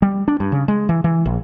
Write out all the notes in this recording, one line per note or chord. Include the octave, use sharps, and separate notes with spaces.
G3
D4
G2
C#3
G#3
E3
E3
A#1